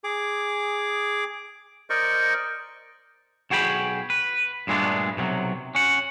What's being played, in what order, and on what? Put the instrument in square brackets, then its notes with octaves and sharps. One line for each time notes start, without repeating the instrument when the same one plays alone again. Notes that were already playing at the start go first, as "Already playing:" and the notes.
[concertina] G#4 D6
A#4 C5 D5 D#5 C#6
[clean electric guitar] B1 F#4 G#4 G5 A#5 B5
B4
G2 A#2 G#3 A3 B3 D4
B1 C3 D#3 F#3
C#4 F#5